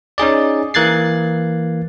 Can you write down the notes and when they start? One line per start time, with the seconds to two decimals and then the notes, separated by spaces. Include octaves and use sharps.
0.18 C#4 D#4 G#4 D5
0.74 E3 A#3 F#6 G#6 A6 C7